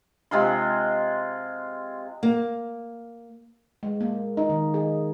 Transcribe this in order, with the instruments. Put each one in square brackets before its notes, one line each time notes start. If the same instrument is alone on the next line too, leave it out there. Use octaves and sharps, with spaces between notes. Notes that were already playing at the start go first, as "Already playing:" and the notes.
[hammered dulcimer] C3 G#3 F4 C6
[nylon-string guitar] A#3
[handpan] G#3
A#3
D#4
D#3
G#4